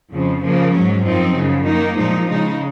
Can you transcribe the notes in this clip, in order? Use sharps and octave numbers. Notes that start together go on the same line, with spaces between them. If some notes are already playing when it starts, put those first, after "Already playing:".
F2 C#3 F3
C#3 F3 A#3
G#2 F#3 C#4
F#2 F3 C4 D#4
F#2 C#3 F3
D#3 A#3 D#4
A#2 F3 G#3 D#4
C#3 G#3 D#4